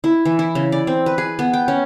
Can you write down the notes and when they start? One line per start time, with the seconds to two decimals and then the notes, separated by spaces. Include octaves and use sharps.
0.04 E4
0.25 E3
0.39 E4
0.55 C#3
0.72 D5
0.87 C4
1.06 B4
1.18 G#4
1.39 B3
1.53 G5
1.68 C#4